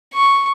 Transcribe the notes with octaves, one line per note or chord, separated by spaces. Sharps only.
C#6